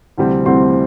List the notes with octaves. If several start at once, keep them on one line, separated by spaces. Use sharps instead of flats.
D2 C3 E3 G3 C4
D2 C3 E3 G3 C4 C6